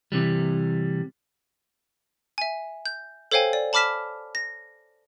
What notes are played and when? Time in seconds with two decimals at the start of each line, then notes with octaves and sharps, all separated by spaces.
0.12 C3 E3 G3
2.38 E5 G#5
2.86 G6
3.31 A4 C5 C#5 F5 G5 G#5
3.53 D5
3.73 A5 B5 D6 F6 B6 E7
4.35 A#6